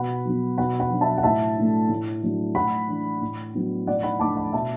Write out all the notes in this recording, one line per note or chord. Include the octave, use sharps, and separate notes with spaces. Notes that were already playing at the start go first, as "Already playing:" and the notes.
Already playing: B2 F#5 B5
F#3 B3
B2 F#5 B5
F#5 B5
F#3 D4
E5 A5
F#5
A2 E5 A5
A3 D4
A2
F#3 A3 D4
A2 F#5 B5
E3 D4
A2
F#3 B3 D4
A2 D5 F#5
F#5 B5
A3 D4 A5 D6
F#5 B5
B2 E5 A5